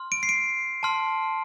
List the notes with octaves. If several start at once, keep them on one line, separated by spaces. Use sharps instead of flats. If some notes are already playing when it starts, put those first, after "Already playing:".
Already playing: C6 F6
D7
C7
D7
A5 C6 F6